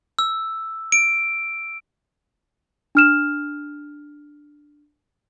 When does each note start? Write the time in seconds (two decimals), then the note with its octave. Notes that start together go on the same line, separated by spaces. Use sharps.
0.19 E6
0.92 D7
2.95 D4 F6 E7